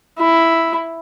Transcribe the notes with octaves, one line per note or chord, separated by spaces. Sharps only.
E4